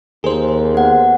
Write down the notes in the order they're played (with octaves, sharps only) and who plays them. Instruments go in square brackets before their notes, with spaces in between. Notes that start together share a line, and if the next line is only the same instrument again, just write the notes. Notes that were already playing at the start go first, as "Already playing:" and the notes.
[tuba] D#2 [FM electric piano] G#4 C5 [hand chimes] A#4
[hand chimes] B3 F#5